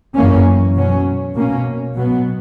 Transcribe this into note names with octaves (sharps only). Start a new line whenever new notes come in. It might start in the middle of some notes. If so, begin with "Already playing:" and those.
F#2 E3 A#3 C#4
B2 F#3 C#4
B2 A#3 C#4
B2 F#3 B3